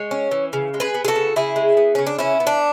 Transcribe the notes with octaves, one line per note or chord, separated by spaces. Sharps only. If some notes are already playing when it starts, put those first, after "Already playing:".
Already playing: G#3 C#5
C#4
E3
C#3
G#3
G#4 B4
B3
G#4
F#4 A4
C#3
C#3 E4 G#4
G#3
B3
C#3 C#4
D4
E3 C#4 E4
B3
D4